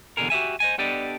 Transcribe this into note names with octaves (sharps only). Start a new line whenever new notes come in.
E2 B2 D3 E3 G#4 A#4
F#4 G4 E5 G#5
C5 D#5 G#5
B3 D4 G4 A4 D5 D#5